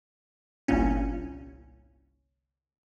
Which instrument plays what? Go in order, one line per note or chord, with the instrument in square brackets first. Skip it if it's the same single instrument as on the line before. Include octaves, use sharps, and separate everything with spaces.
[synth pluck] G1 C2 A#2 C#4